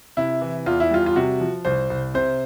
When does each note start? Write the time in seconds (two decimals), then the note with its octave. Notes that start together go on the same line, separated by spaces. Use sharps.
0.17 C3 E4
0.41 E3
0.66 E2 F4
0.80 E4
0.91 G3 F4
1.06 F4
1.16 C3 F#4
1.41 F3
1.65 C2 C5
1.90 C2
2.14 C3 C5